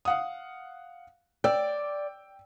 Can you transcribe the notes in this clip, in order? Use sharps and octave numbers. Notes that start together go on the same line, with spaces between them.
F5 F#5 D#6
D5 G5 E6